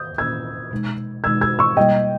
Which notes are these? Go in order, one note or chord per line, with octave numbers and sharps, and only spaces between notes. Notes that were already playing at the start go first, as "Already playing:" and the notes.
Already playing: D#6 G6
A#2 A#3 C#4 E4 E6 G#6
B2 G#3 D#4
B2 G#3 D#4 E6 G#6
E6 G#6
C#6 E6
B2 G3 A#3 E4 D#5 G5